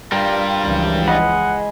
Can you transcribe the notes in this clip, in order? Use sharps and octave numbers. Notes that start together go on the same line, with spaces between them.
G2 G3 F4 A#4 G5
C#2 E3 F3
G#3 D#5 F#5 B5